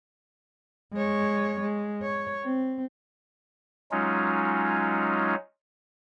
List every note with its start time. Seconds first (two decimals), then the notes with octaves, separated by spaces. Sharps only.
0.93 G#3 C#5
1.61 G#3
2.02 C#5
2.44 C4
3.92 F#3 G#3 C#4 D#4 F4